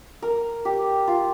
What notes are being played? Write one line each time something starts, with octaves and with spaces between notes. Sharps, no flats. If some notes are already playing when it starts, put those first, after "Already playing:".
A#4
G4
F4